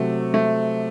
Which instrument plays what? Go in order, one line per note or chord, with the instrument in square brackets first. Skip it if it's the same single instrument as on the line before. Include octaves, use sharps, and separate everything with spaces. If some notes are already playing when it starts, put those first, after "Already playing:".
Already playing: [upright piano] C3 F#3 C4 [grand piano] A3
[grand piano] A3